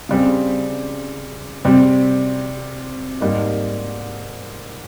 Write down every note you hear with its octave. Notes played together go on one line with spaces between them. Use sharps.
C#3 G3 C4
C3 G3 C4
G#2 G3 A#3 D#4